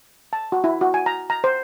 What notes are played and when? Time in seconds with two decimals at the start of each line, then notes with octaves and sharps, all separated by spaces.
0.33 A5
0.52 F#4
0.64 E4
0.81 F#4
0.94 G#5
1.06 A#5
1.30 A#5
1.44 C5